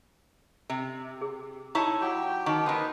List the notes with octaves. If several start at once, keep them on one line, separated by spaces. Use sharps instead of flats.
C3
G#4
D#4 E4 C#5 A5 C#6
F#3 G4 G5
D#3 D#4 C#6
D#3 A#3 B4 C5 D#5